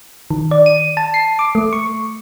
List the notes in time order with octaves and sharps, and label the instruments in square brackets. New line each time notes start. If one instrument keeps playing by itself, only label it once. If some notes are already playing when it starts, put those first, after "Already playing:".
[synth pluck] D#3
D5
D#7
A5
C7
D6
A3
C#6